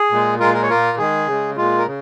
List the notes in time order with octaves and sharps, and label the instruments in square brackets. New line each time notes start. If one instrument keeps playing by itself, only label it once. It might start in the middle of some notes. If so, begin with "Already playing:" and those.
Already playing: [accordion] G#4
A#2 G#3
A#2 G#3 F4 A#4
A#4
C#5
A#2 A#3 F4 A#4
D#3 G#3 G#4
C#3 G#3
A#2 G#3 F4
A#4
C#3